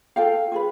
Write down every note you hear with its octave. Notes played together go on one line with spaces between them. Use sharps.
F4 A4 F5 G5
F4 G#4 B4